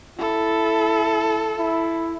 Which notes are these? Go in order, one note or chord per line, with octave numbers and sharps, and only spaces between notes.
E4 A4
E4